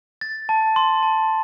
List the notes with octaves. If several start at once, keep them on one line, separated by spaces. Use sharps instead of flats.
A6
A5
C6
A5